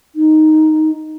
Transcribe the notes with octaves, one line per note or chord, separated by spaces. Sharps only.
D#4